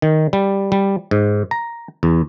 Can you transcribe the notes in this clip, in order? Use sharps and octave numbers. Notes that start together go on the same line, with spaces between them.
D#3
G3
G3
G#2
A#5
E2